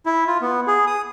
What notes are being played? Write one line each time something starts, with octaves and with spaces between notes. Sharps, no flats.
E4
F4
B3
G#4
D#6